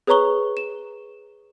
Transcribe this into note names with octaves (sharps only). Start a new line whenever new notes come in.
G#4 B4 C#5 A#5 C#6 G7
E7